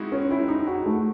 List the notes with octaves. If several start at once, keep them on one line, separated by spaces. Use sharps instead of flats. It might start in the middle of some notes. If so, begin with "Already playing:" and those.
Already playing: G#3 C4 D#4 E4 F#4 G#4
C#4
E4
D#4
F#4
A3